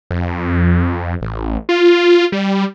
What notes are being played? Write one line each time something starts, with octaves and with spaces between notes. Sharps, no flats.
F2
A1
F4
G3